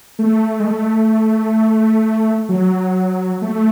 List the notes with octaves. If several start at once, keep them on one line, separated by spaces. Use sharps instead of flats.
A3
G#3
A3
F#3
A3